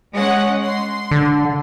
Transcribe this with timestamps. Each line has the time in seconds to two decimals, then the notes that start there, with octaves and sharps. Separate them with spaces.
0.13 G#3 C#4 F#5
0.63 C6
1.11 D3